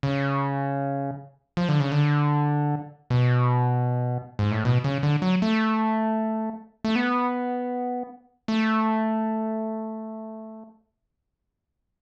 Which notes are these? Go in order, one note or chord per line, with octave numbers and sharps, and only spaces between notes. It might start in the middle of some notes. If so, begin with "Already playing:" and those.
C#3
F3
D3
C#3
D3
B2
G#2
A2
B2
C#3
D3
F#3
A3
A3
B3
A3